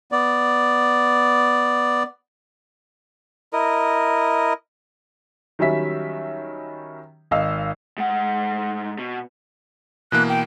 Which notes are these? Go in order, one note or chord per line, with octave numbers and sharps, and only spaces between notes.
B3 D5
E4 A#4 D#5
D#3 F#3 G3 C#4 E5 B6
G#1 D#5 F5 E6
G#2 F#5
B2
B2 E3 A#3 F#6
G5